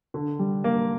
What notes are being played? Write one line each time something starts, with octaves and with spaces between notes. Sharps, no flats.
D3
G3
A#3